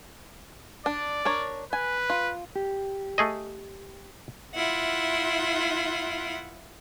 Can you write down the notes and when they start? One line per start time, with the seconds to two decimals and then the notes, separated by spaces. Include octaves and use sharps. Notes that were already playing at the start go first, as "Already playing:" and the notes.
0.86 D4 D5
1.25 D4 A#4 C#5
1.73 B4 G#5
2.10 F4
2.56 G4
3.18 A3 G#4 D#5
4.54 E4 F4 E5 F#5